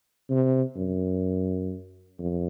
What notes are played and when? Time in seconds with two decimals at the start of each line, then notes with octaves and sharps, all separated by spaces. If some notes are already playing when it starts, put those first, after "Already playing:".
0.30 C3
0.77 F#2
2.19 F2